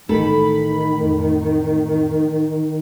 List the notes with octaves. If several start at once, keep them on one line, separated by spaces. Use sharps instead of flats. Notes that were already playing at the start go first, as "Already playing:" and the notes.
A1 D#3 A4 B5
F2 A2